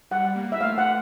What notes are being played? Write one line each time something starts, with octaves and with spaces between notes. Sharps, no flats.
G3 F#5
A#3
E5
A3 F5
F#5
A3